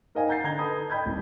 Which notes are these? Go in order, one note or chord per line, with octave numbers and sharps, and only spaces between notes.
D#4 A#4 C5 D#5 F5 G#5
F#5 A#5 G6 A6 C7
D3 A#5 G#6 G7
A4 B4 D#5 A5 B5 D#6
D#5 G5 B5 G6 G#6
D#1 C2